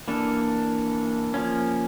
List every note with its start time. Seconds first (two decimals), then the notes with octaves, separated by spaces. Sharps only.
0.08 E3 A#3 D4 A4
1.34 F3 A#3 C#4